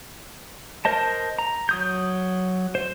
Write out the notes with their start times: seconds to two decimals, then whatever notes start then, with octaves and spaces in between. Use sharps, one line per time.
0.85 A#4 C5 D#5 A5
1.39 A#5
1.69 F#3 D#6 G6
2.75 C5